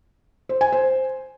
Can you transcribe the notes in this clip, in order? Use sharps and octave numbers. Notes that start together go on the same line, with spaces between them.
C5
G#5
C5